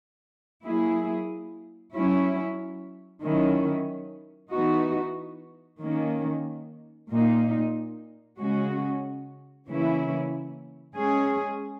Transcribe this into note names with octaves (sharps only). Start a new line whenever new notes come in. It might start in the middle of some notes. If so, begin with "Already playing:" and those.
F#3 A#3 E4 G#4
F#3 C#4 E4
D#3 F#3 C#4 E4
E3 B3 D#4 F#4
D#3 A#3 C#4
A#2 A#3 D#4
C#3 G#3 C#4 F#4
C#3 E3 A#3 C#4 E4
G#3 C#4 G#4